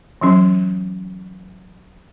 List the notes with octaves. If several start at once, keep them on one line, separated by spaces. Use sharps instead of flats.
E3 F#3 C#4